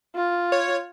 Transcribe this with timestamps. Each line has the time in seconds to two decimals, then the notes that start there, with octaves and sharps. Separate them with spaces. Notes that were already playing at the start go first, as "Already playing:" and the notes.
0.15 F4
0.52 C#5